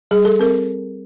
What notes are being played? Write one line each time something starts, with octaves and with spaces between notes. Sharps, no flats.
G3 G#4
A4
C4 A#4